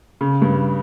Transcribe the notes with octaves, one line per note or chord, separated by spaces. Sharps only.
C#3
G2